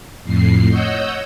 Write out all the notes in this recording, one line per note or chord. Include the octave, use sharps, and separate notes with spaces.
F2 A2 C7
C#5 D#5 F#5 E6 G6